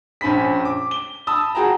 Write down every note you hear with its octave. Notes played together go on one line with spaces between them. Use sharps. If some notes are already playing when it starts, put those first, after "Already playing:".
A#1 C#4 C5 B5 B6
D6
G7
A5 B5 D#6 E6
F#4 G#4 G5 A5 A#5